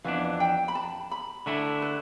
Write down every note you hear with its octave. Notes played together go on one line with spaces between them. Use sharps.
F2 E3 B3 D4 F5
G5
B5
A5
B5
D3 A3 E4 A5
B4